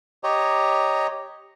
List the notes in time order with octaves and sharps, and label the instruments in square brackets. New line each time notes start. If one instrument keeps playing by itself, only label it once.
[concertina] G4 C#5 D#5 A#5